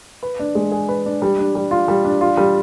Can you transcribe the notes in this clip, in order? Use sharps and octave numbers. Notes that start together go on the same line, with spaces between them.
B4
D4
G#3
G#4
B4
D4
G3
D4
G3
F4
G3
D4
F4
G3